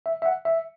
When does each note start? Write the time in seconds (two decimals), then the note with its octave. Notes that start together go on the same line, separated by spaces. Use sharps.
0.06 E5
0.22 E5
0.26 F#5
0.45 E5